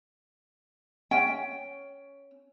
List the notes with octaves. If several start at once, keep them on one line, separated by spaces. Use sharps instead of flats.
C#4 G5